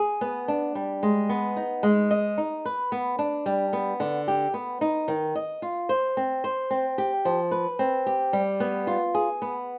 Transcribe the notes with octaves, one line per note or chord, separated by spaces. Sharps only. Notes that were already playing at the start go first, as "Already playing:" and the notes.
Already playing: G#4
B3
D4
G3
G#3
B3
D#4
G#3
D#5
D#4
B4
B3
D4
G3
B3
D3
G4
B3
D#4
D#3
D#5
F4
C5
C4
C5
C4
G4
F3
B4
C4
G4
G3
B3
F4
G#4
B3